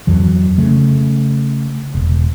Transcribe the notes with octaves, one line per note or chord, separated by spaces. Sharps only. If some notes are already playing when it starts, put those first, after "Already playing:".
F2 E3 F#3
C#3 A3
E1